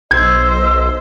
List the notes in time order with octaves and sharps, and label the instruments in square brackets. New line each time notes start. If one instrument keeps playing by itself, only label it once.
[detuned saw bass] B1 [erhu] C5 [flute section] D#5 E6 [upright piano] G#6